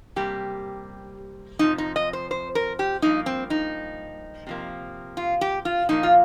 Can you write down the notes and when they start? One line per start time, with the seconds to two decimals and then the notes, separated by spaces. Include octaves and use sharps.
0.16 C3 G3 A#3 G4
1.59 F2 C3 F3 D#4
1.78 D#4
1.96 D#5
2.13 C5
2.31 C5
2.55 A#4
2.79 G4
3.02 G2 F3 A#3 D#4
3.26 C4
3.50 D#4
4.47 C3 F3 A#3
5.17 F4
5.41 G4
5.65 F4
5.89 A#2 F3 A#3 D#4
6.03 F4